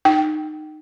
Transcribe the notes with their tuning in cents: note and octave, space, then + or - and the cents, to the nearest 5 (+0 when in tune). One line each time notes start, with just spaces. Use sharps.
D#4 -20 G5 -15